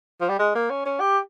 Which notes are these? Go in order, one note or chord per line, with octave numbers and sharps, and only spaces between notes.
F3
G3
G#3
A#3
C#4
C#4
G4